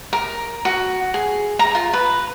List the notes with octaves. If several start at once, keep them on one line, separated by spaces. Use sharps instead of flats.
A#4
F#4
G#4
A#5
F4
B4